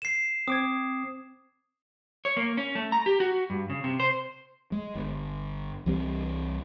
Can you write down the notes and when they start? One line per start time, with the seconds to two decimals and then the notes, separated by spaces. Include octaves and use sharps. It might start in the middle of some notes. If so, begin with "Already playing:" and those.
0.02 C7 E7
0.48 C4 D6 D#6 G#6
2.25 C#5
2.37 A#3
2.57 C#4
2.75 A3
2.92 A#5
3.06 G4
3.20 F#4
3.50 G2
3.70 C#3
3.84 C3
4.00 C5
4.72 G#3
4.95 G1
5.86 C2 E3 G3 C4